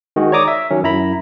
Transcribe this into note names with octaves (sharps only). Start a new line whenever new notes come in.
D#3 G#3 F#4 G#4
C#5 D5 A#5 D6 D#6
E5
D#3 F#3 C#4
F#2 E4 A#5 B5